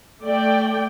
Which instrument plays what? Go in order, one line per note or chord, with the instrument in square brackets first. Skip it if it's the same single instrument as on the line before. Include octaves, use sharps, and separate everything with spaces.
[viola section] A3 D5 G5